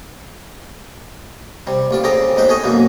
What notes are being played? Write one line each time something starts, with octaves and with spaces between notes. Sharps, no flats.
C3 G3
A1 F4 D5
C#3 C4 G#4 A4 A#5 D6
E2 G#3 D#4 C5 E5
G#4 A4 C5 C#5 D#5 G#5
F#2 B2 E3 A#3